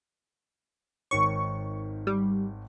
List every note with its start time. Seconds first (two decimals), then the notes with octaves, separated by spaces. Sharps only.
1.11 G#1 D#3 C#5 C#6
2.07 G3